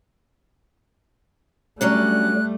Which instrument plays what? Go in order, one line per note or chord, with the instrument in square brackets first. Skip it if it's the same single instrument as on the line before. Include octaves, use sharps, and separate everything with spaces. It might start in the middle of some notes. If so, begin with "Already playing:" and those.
[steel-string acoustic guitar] F#3 C#4 D4 [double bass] G3 A3 [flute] F#6